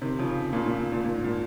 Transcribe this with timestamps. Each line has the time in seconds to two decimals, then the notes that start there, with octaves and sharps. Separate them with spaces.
0.02 C3 D#3
0.19 C#3 F3
0.53 A#2 C#3
0.66 A#2
0.92 A#2
1.04 A#2
1.14 G#2
1.24 A#2